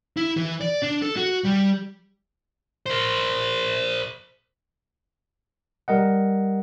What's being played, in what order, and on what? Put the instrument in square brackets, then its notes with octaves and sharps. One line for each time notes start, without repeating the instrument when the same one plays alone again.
[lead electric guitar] E4
E3
D5
D4
A4
F#4
G3
A#4 C5
[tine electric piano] G3 A#4 D#5 F#5